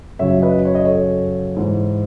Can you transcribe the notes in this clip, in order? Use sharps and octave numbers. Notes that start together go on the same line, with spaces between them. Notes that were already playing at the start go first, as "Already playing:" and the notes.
F#2 C#3 F#3 C#5 E5
B4 D#5
C#5
D#5
A4 C#5
G#2 E3